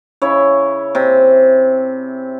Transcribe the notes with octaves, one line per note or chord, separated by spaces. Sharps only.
C#3 E4 C#5
C3